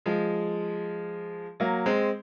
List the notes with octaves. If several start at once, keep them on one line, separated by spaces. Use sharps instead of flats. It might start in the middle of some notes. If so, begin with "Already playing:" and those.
F3 G#3
F#3 A#3
G#3 C4